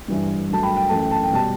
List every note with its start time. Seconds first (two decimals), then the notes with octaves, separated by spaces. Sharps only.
0.08 G2 E3 G3
0.50 G2 F#3 A3 A5
0.63 G5 B5
0.76 G5
0.88 F#2 E3 A3 A5
0.99 G5
1.11 A5
1.23 G5
1.31 B2 G3 A5